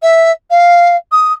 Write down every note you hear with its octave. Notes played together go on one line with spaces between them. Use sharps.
E5
F5
D#6